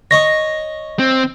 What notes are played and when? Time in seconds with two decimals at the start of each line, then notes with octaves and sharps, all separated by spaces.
0.11 C#5 D#5 C#6 A#6
0.99 C4